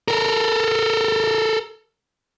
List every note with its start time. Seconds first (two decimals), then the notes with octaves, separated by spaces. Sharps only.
0.08 A4 A#4